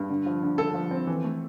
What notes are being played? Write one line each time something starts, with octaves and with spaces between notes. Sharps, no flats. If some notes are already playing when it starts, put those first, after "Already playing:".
Already playing: G2
D3
F3
D3
D3 A4
F3
C4
E3
A3